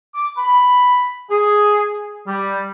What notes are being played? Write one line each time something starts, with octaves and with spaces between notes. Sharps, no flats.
D6
B5
G#4
G3